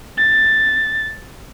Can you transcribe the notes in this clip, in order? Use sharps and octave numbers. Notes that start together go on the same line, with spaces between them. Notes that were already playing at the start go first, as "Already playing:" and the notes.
A6